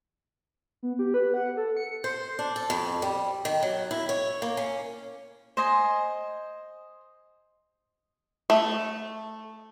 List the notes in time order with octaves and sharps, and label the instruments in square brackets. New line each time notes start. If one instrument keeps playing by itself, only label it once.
[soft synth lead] B3
G4
B4
F#5
A4
C#7
[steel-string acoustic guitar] C5
D4
A4
F2
G3
D#3
F#3
E4
C#5
A#3
C#4
[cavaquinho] C5 D#5 G#5
[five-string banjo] A3